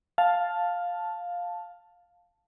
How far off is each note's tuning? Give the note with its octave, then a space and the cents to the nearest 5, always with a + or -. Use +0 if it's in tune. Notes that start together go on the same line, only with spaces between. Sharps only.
F5 +10 A5 +0